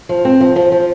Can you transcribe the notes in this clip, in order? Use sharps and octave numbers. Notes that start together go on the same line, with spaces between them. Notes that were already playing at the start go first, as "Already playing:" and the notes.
F3
C4
F3
F3
F3